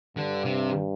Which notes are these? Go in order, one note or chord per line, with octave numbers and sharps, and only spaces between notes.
G2 D3
C3